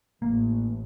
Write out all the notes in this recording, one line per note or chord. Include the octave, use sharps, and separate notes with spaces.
A1 A#3